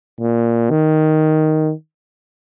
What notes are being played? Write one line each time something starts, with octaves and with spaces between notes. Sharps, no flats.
A#2
D#3